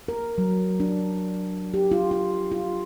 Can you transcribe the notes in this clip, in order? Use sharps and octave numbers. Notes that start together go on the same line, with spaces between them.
A#4
F#3
D4
G4
F4
F4
F4